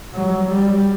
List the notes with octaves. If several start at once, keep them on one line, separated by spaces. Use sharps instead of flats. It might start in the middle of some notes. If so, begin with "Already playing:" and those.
F#3
G3